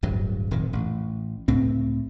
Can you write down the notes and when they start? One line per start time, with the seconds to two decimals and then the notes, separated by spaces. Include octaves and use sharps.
0.03 D1 G1 G2 F#3
0.51 D#1 F2 A#2 D#3
0.73 A1
1.48 C#2 A2 C4